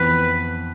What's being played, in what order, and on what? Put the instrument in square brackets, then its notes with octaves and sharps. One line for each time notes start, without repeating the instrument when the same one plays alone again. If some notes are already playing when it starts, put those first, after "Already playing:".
Already playing: [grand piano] F2 E3 B3 [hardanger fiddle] B4